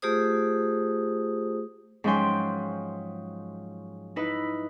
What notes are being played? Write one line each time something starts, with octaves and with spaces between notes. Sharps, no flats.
A3 F4 G4 G#4 C5 D#6
G#2 F3 F#3 C#4 G5 C6
D#4 E4 B4